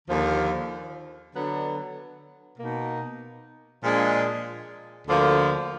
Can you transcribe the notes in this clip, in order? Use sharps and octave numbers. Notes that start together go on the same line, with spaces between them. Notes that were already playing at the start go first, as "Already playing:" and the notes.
D#2 D3 F3
D3 F#3 B3 D4
B2 A#3 D#4
A#2 F3 G#3 D4
D2 D3 F3 A#3